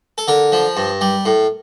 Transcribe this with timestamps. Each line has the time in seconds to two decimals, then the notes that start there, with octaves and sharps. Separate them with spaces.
0.18 A4
0.28 D3 A#4
0.52 F3
0.77 G2
1.01 G3
1.26 A2